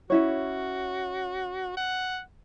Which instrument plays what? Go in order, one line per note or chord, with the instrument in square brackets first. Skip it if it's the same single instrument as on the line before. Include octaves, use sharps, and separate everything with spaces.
[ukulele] C#4 E4 C#5 [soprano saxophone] F#4
[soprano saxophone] F#5